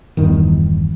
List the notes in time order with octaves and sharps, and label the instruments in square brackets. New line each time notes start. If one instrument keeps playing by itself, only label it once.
[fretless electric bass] D1 E2 G2 D#3